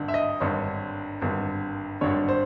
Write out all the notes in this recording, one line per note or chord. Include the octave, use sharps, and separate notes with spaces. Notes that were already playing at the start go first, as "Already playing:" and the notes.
Already playing: G#1 G2 D3
E5
D#5
G#1 G2 D3 C#5
G#1 G2 D3
G#1 G2 D3 C#5
C5